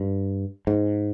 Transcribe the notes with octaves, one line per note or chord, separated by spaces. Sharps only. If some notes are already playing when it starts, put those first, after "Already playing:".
Already playing: G2
G#2